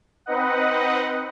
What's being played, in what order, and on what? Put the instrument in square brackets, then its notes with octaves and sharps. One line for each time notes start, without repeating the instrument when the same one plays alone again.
[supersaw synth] C4 D#4 B4 D#5 F#5